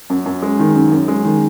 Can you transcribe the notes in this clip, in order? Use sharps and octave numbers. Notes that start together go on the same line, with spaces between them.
F#2
F#2
G#3
D#3
F#2
F#2
G#3
D#3